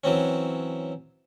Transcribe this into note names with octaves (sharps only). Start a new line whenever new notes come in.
E3 F#3 C4 C#4